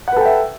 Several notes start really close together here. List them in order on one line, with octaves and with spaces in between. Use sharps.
F#5 B4 A4 G5 E5